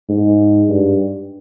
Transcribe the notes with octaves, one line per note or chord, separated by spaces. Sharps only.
G#2
G2